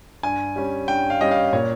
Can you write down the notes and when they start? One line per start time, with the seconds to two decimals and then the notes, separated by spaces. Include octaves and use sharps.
0.23 G2 G#5
0.56 G3 C#4
0.88 G2 G5
1.10 F5
1.21 G3 C#4 D#5
1.31 F5
1.53 A#2 C#5